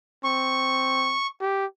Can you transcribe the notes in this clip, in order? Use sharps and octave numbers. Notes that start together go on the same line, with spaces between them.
C4 C#6
G4